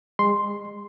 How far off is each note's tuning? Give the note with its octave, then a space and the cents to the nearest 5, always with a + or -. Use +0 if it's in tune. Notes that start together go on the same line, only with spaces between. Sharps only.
G#3 -35 C6 +0